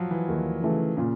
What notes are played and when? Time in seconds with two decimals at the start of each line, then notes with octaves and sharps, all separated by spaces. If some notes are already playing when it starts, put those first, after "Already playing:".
Already playing: F3 F#3
0.11 E3
0.28 D#2 D#3
0.62 C#3 E3 A3
0.97 A#2 C#3